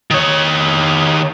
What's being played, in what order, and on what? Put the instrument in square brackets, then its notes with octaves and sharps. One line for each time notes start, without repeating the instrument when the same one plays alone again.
[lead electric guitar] D#3 C#5